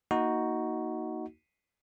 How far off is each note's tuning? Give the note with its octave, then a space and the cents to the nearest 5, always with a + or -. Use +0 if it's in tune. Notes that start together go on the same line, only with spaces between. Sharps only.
A#3 +0 D#4 +10 F#4 +0